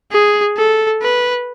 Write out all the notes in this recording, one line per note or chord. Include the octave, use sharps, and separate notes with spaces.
G#4
A4
B4